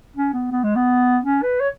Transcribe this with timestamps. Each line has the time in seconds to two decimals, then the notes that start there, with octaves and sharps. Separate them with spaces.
0.16 C#4
0.33 B3
0.51 B3
0.64 G#3
0.76 B3
1.24 C#4
1.42 B4
1.60 C#5